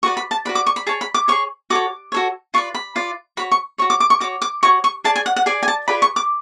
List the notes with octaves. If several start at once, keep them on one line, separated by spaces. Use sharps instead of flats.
F#4 B4 D5 C#6
B5
A5
F#4 B4 D5 B5
D6
C#6
B5
G#4 C#5 A5
B5
D6
G#4 C#5 C#6
F#4 A4 C#5 D6
F#4 A4 C#5
F4 B4 D5 C#6
B5
F4 B4 D5
F#4 C#5 B5
C#6
F#4 C#5 C#6
D6
D6
C#6
F#4 C#5 D6
D6
F#4 C#5 C#6
C#6
G#4 D5 A5
G#5
F#5
F#5
G#4 D5 G#5
G#5
A5
F4 G#4 B4 D5 B5
C#6
D6